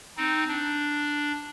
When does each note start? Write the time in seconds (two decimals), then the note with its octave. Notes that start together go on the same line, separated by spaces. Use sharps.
0.17 C4 D#4
0.48 D4